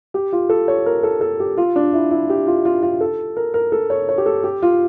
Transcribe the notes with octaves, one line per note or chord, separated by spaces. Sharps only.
G4
F4
A4
C#5
A#4
A4
A4
G4
F4
D4
E4
E4
G4
F4
F4
F4
A4
A#4
A#4
A4
C#5
C#5
G4
A4
G4
F4